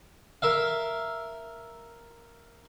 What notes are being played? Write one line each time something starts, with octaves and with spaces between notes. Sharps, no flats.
A#4 E5 F5